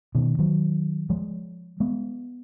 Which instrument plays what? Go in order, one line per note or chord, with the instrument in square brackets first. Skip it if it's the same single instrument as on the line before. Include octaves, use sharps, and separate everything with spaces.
[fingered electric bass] B2 D#3
D#3 F#3
F3 G#3
G#3 B3